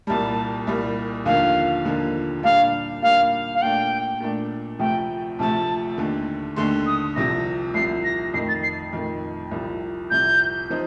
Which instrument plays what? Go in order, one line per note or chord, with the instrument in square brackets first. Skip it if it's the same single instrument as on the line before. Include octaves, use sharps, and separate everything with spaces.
[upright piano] C2 A#2 G3 [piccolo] A5
[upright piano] C2 A#2 G3
[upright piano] D#2 D3 F3 A#3 [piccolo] F5
[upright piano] D#2 D3 F3 A#3
[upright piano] A#2 G3 D4 [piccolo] F5
[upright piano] A#2 G3 D4 [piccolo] F5
[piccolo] F5
[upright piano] A#2 A3 D4 [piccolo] G5
[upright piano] A#2 A3 D4
[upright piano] D2 C3 F3 A3 [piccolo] G5
[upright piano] D2 C3 F3 A3 [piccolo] A5
[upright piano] D#2 D3 A3
[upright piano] D#2 D3 A3 [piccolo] C6
[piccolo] D#6
[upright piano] C2 C3 F3 [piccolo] A#6
[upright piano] C2 C3 F3 [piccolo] C7
[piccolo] A#6
[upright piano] F2 D#3 A3 [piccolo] C7
[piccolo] A6
C7
[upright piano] F2 D#3 A3
C2 C3 F3
[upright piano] C2 C3 F3 [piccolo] G6
[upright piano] F3 C4 D#4